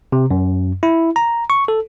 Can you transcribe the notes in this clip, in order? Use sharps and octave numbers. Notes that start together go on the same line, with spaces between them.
C3
F#2
E4
A#5
C#6
A4